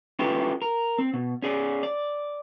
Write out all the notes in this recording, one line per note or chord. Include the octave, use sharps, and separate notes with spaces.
C#4 E4 F4 G4 A4 B4
A#4
C4
B2
C#4 G#4 D5
D5